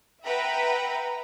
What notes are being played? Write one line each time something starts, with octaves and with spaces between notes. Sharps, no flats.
B4 E5 F#5 G5 A#5 B5